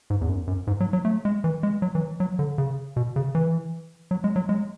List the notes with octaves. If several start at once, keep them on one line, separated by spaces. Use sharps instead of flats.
G#2
E2
F#2
F#2
G#2
F#3
F#3
A3
G#3
E3
G#3
F#3
E3
F#3
D3
C#3
B2
C#3
E3
F#3
G#3
F#3
G#3